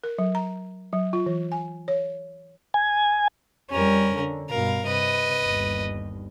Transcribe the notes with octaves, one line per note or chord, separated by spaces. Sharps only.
A#4
F#3
A#5
F#3
F4
E3
G#5
C#5
G#5
F2 G3 C#4 A#4
D3
G2 B2 A#4 F5
C3 B4 D#5
G1 D#2